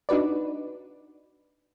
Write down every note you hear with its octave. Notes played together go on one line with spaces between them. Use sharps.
D4 D#4 F#4 B4 D5